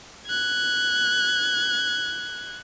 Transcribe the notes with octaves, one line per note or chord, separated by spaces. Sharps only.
F#6 G#6